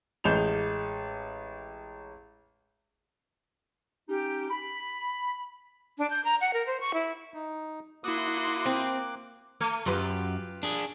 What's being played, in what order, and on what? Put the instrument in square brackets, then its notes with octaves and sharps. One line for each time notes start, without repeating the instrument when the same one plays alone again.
[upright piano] A1 G#3 G6 E7 F7
[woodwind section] C#4 D#4 G4
B5
[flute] D4
G6
A#5
F#5
A#4
C5
C#6
E4
[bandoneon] D#4
[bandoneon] A#3 D6 F#6 [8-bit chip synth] E4 D#6 [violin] F#4 C6
[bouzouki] C4
[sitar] A3
[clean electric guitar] F#2 [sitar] F4 G4 B4
[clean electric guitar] D4 G#4